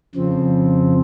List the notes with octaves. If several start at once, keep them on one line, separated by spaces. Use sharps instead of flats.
F2 C#3 F3 C4